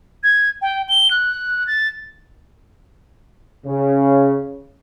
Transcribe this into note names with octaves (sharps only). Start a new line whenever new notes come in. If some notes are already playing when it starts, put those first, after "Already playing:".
G#6
G5
G7
F#6
A6
C#3